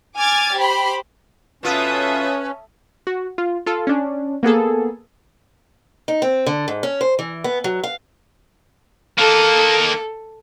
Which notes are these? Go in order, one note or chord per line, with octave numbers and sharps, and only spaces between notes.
G#5 D6 F6 G#6 A6
G4 C5 B5
B2 C#4 F4 A4 B4 E5 D#6
F#4
F4
F4 A4
C#4 D4
A#3 B3 G#4 A4
D#4
C4
D3
G#2
C#4
C5
E3
B3
F#3
F5
D#3 A#3 A4